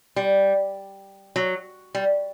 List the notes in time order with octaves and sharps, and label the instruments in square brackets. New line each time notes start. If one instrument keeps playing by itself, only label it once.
[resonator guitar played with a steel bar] G3
F#3
G3